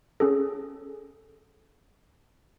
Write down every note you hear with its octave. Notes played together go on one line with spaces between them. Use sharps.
C#4 G#4 A4